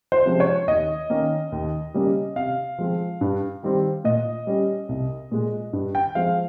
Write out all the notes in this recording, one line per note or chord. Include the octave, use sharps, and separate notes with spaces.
C5
C3 F3 G#3 C#4
C#5
D#2 D#5
D#3 A#3 C#4
D#2
C#3 G3 A#3 C#4
C3 F5
F3 G#3 C4
G2
D#3 G3 C4
A#2 D#5
G3 C#4
C2
A#2 G#3
G2
G5
F3 G#3 C4 F5